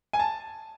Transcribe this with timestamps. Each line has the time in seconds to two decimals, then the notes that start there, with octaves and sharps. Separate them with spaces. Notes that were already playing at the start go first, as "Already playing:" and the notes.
0.13 G#5
0.19 A5